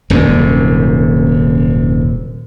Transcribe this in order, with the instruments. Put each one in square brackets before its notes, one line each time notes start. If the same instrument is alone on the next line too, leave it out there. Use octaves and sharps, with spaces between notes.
[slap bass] D#1 F#2 C3